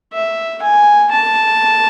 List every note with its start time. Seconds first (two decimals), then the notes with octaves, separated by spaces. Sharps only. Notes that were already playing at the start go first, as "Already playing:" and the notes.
0.13 E5
0.62 G#5
1.12 A5